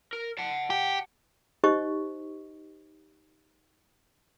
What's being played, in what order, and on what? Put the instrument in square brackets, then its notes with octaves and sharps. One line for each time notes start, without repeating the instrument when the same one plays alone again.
[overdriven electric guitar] A#4
F#5 A5
[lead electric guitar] G4
[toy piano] D#4 G4 C5 D#5 C#6